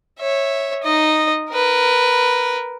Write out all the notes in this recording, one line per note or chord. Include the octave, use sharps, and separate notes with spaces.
C#5 E5
D#4 D#5
A#4 B4